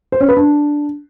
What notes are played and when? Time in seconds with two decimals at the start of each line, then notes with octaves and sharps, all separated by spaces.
0.12 C5
0.20 C#4
0.29 B4
0.37 D4